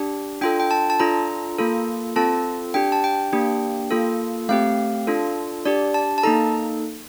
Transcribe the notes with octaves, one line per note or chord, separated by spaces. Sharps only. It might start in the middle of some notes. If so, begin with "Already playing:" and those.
Already playing: D4 G4
D4 F4 A4 G5
G5
A5
A5
D4 F4 A4 A#5
A#3 F4 A4
C4 F4 A4 A5
D4 G4 G5
A5
G5
A#3 D4 G4
A#3 F4 A4
A3 C4 G4 F5
D4 F4 A4
D4 G4 D5
A5
A5
A#3 D#4 A4 A#5